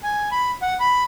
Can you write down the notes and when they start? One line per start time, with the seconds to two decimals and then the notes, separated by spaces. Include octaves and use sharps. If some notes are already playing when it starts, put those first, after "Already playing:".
0.03 G#5
0.32 B5
0.62 F#5
0.80 B5